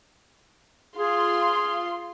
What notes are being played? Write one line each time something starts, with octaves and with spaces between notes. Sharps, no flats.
F4 G#4 C6